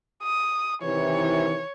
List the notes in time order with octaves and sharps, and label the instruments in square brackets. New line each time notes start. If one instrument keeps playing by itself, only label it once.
[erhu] D#6
[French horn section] C3 D#3 E3 [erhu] C#5